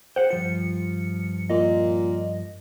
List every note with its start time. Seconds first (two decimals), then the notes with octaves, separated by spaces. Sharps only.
0.16 G#4 C5 F#5 G5
0.31 G2 F3 F4 C#7
1.50 A#2 D#5